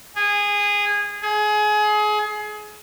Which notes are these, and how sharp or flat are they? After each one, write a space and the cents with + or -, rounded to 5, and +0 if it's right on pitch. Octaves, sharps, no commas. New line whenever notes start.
G#4 -20
G#4 +25